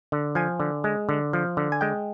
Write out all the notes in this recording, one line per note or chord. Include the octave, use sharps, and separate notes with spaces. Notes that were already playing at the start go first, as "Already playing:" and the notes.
D3
F3 G#5
D3
G#3
D3
F3
D3
G#5
G#3 G5